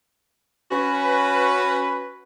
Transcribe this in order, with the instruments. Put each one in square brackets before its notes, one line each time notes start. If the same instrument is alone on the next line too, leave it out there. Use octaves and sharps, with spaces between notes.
[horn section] C#4 F#4 B4